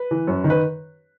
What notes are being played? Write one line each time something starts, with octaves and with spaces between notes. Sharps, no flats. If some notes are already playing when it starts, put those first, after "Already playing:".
Already playing: B4
E3
F#2
D#3
B4